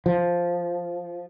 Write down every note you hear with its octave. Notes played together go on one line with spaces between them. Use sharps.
F3